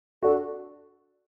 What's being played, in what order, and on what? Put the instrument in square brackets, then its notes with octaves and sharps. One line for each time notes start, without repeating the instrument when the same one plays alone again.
[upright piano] D4 F#4 [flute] A4